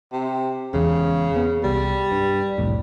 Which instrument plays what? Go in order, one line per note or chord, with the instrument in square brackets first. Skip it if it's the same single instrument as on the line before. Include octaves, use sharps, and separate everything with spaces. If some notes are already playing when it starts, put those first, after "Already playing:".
[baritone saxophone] C3
[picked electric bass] E1 E2 [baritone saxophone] C#3
[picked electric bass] B3
[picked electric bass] C2 [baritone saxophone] G3
[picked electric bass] G2
C2 F2 A2